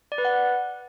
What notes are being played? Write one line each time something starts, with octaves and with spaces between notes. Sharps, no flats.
D5
B4
F#5